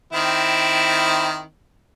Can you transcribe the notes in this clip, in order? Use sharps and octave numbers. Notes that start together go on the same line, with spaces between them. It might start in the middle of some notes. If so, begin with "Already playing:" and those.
D#3 C4 E4